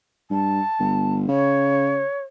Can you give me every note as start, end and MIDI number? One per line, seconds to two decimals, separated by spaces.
0.31 0.60 43
0.31 1.15 81
0.80 1.25 31
1.28 2.02 49
1.28 2.20 73